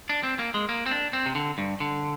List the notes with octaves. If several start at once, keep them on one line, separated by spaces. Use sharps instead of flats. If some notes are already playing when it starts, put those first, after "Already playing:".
D4
C4
A#3
G#3
A#3
C4
D4
C4
C3
D3
G2
D3